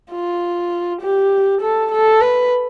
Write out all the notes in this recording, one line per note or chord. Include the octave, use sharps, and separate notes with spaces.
F4
G4
A4
A4
B4